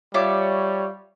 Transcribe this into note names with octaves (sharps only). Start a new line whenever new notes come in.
G3 F4 C#5 E5 D6